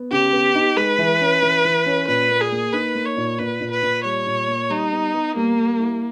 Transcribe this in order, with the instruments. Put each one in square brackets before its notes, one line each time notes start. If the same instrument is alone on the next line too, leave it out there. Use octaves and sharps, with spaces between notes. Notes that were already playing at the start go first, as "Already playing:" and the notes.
Already playing: [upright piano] B3
[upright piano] C#3 [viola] G4
[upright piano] B3
D#4
[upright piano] G#3 [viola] B4
[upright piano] E3
C#4
E3
E3
C#4
[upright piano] A#2 [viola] B4
[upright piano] A#3
[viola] G#4
[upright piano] A#3
[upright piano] D#4 [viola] B4
[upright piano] A#3
[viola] C#5
[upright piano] A#2
[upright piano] A#2 [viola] B4
[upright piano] A#2
[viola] B4
[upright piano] A#2
[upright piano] G3 [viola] C#5
[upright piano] A#2
A#3
[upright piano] G3 [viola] D#4
[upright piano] B3
B3
[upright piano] G3 [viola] A#3
[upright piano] G3
E4